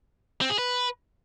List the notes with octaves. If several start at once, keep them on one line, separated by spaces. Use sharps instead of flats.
C4
G#4
B4